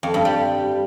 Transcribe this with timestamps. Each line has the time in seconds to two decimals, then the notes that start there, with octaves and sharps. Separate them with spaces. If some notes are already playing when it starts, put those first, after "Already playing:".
0.03 F2
0.14 G2
0.25 G3